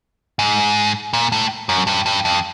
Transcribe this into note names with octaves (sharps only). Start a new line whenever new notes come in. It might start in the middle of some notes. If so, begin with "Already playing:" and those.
G#2
A#2
A2
F#2
G2
G2
F2